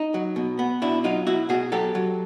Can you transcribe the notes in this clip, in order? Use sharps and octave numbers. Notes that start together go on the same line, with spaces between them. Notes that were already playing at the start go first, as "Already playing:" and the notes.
Already playing: D#4
F#3
B2
B3
B2 D4 E4
F#3 D#4 F4
B2 E4 F#4
B2 F#4 G#4
F#3 G4 A4
F#3